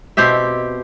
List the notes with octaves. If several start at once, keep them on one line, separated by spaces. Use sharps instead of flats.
B2 C4 G4 E5